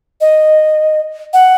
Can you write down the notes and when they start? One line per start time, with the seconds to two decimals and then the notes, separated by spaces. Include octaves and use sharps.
0.21 D#5
1.33 F#5